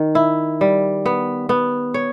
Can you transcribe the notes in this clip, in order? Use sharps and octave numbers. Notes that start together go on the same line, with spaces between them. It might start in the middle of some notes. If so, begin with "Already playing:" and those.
Already playing: D#3
E4
G3
B3
B3
C#5